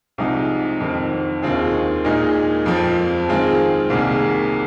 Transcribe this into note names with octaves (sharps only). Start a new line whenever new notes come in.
C2 C3 F3 G#3 D#4
F2 D#3 C4
D#2 D#3 C4 F4 G#4
A#2 G#3 D#4 G#4
F2 F3 C4
D#3 G#3 C4 F4 G#4
C2 C3 D#3 A#3 G#4